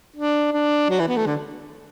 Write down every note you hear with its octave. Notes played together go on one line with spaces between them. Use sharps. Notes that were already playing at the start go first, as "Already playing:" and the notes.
D4
D4
F#3
E3
B3
A3
D3